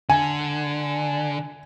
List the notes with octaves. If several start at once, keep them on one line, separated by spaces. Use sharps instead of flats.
D3 G#5